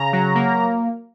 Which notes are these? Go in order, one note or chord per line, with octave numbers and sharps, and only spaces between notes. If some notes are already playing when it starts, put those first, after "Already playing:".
Already playing: C#3 A#5
F#3
A#3